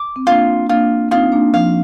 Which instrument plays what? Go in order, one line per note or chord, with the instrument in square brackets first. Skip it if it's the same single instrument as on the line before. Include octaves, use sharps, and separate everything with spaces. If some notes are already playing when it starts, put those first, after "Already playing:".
Already playing: [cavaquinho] D6
[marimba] C4
[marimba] A#3 D4 [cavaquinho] F4
[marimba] A#3 D4 [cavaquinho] F4
[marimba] C4 D#4 [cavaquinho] F4
[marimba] A#3 D4
[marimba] F3 [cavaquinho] F5